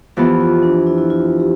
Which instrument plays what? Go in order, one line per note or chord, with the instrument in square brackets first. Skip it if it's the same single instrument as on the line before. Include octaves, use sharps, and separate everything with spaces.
[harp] F2 E3 B3 [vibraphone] G4
[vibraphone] F4
D4
E4
E4
F4
G4